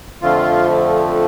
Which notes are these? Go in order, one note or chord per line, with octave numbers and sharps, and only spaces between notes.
F2 D3 F3 A3 F4